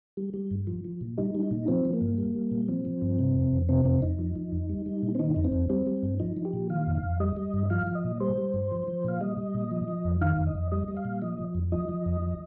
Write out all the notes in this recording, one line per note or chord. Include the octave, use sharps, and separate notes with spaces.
G3
G3
G2
F3
F3
A#2
G3 D#4
G3
D#4
A#2
F3 C4
F3
A#3
G2
G3
G3
A#2
F3 C4
F3
G2
C3
F2
F2
C3 C4
F2 C4
F2 D#4
F3
F3
F2
G3
G3
A#2
C4
D#3 D#4
F2 D#4
C4
F2
G3 C4
G3
G2
F3 D#4
F3
G4
A#2
D#3 F5
F2
F5
F2
G3 D#5
G3
G2
F3 F5
F3
D#5
A#2
G3 C5
G3
G2
F3
F3
A#2 F5
G3 D#5
G3
A#2
F3
F3
F2
D#3 F5
F2
D#5
F2
G3 D#5
G3
F5
A#2
F3 D#5
F3
F2
F3 D#5
F3
F2
F3